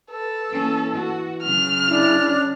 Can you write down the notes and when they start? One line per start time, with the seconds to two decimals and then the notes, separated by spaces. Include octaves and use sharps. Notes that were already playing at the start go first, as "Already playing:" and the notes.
0.11 A4 B4
0.51 E3 A#3 C#4
0.95 F#4
1.43 C#3 F#3 F6
1.89 D4 E4
2.19 C#4